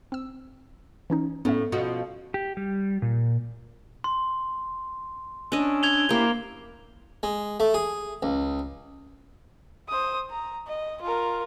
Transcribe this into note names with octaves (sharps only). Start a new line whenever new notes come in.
C4 E6
E3 C#4 D#4
A2 B3 C#4 E5
B2 F3 F#4
G4
G3
A#2
C6
C#4 D4 D#5 E6
G#6 F7 G7
A#3 E4 G4 C5
G#3
A3
G#4
C#2
C5 D#6
A#5
D#5
F4 A#4